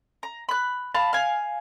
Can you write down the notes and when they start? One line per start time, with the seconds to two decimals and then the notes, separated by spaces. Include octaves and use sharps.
0.23 A#5
0.49 B5 F#6
0.95 F5 A5 B5
1.13 F5 G#5